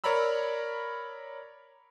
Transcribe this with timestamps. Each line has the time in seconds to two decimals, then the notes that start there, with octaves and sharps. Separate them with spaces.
0.04 A#4 C#5 D5 A#5 B5 E6